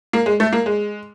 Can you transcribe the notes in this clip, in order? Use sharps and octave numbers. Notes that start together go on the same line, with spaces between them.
A#3
G#3
A3
A#3
G#3